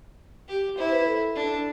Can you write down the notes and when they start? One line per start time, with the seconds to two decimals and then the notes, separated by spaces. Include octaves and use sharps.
0.48 G4
0.77 E4 C5
0.92 B4
1.07 A4
1.36 D4